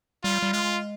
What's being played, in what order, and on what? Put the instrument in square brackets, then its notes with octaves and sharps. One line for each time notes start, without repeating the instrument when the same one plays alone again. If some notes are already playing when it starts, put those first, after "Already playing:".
[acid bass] G3 [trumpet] F4
[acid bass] G3
[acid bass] G#3 [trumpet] F4